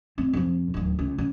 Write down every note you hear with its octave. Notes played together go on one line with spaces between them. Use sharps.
C4
F2 F3
D1 D#2
C#2
C#3